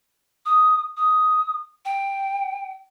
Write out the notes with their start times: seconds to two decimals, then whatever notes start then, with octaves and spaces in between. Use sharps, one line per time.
0.46 D#6
0.97 D#6
1.85 G5